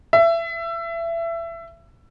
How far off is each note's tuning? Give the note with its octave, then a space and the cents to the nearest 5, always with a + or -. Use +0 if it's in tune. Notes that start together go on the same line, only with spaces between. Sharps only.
E5 +25